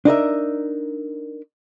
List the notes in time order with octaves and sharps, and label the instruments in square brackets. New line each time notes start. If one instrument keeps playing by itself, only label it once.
[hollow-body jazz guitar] D4 D#4 A#4 E5